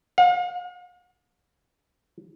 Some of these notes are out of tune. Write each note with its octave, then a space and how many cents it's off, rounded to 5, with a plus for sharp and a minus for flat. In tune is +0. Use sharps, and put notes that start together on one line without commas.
F5 +45